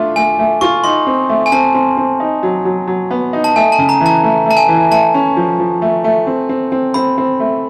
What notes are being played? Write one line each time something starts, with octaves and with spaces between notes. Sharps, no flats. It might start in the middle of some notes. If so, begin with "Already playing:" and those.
Already playing: A3 D4 F4
A3 G#5
A3
F4 C#6
D#4 C6
C4
A3
G#5
C4 A5
C4
C4
D#4
F#3
F#3
F#3
B3
D#4
A5
A3 G#5
A5
C#3
A#5
E3
A5
A3
A3 A5
G#5
E3
A3 A5
C#4
F3
F3
A3
A3
C4
C4
C4
C4 B5
C4
A3